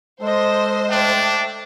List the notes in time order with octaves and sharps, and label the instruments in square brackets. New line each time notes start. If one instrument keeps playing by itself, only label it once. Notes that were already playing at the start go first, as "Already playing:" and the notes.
[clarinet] G#3 [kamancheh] A4 D#5 [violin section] C5
[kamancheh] A3 G5 [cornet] D4